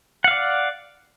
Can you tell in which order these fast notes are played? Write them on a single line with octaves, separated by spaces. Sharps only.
F#5 F5 D5